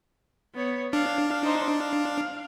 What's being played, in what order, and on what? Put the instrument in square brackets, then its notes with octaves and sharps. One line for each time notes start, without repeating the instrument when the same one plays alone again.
[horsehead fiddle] B3 C#5
[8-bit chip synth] D4 [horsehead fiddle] F5
[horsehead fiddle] D#4 C5
F5